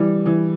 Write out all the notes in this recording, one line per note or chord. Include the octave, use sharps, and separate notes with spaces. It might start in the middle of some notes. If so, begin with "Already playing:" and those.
Already playing: E3 G3
E3